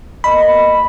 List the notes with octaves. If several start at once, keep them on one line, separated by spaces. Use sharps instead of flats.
B2 A#3 D#5 B5